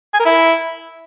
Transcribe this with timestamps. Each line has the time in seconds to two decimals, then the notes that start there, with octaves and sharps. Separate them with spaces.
0.14 G#5
0.20 A#4
0.25 E4